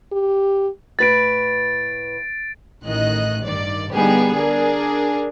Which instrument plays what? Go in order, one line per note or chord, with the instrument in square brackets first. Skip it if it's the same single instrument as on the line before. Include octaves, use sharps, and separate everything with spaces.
[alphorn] G4
[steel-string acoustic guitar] A2 B4 [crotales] A6 D7
[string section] A1 D#3 D#5 F#6
G2 D#3 D5
D3 G3 B3 D#4 G4 G#4
D4 G#4 A#4